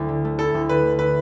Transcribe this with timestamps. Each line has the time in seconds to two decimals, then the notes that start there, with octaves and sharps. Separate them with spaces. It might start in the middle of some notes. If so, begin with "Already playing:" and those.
Already playing: D2 E4
0.09 D3
0.25 A3
0.39 E4 A4
0.54 D2
0.69 D3 B4
0.85 A3
0.99 E4 B4